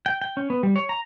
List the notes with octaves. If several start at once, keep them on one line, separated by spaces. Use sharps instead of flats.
G5
G5
C#4
B3
G3
C#5
A#5